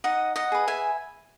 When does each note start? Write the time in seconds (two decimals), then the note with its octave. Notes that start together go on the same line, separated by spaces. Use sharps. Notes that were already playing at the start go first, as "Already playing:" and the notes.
0.04 D#4 D#5 F#5
0.36 D#5 F#5
0.52 G#4 B4
0.68 E5 G#5